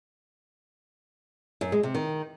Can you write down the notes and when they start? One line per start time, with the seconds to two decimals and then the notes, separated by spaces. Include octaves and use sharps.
1.61 F#2
1.72 G#3
1.83 C3
1.95 D#3